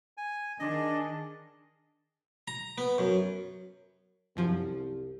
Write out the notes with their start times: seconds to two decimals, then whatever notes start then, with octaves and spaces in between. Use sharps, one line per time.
0.17 G#5
0.60 D#3 D4 G#4 D#5
2.48 A#5
2.78 B3
2.98 F#2
4.37 C2 F#2 F3